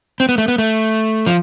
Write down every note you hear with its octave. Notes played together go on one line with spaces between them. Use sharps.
C4
B3
A3
B3
A3
F3